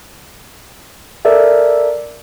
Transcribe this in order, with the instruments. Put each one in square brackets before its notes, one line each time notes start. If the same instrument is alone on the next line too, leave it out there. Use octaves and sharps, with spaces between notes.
[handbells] A4 A#4 D5 E5